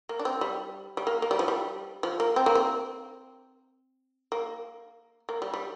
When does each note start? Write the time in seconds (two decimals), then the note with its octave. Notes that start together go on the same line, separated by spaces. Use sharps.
0.09 A#3
0.19 D4
0.25 C4
0.41 G3
0.97 G3
1.07 A#3
1.22 A#3
1.31 G3
1.39 F3
1.48 G3
2.03 F3
2.20 A#3
2.36 C4
2.46 A#3
2.55 C4
4.32 A#3
5.29 A#3
5.42 G3
5.54 G3